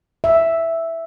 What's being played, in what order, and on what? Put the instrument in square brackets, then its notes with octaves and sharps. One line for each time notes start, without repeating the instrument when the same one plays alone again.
[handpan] E5